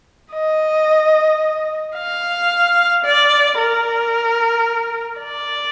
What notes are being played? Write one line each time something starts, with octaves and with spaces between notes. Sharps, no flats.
D#5
F5
D5
A#4
D5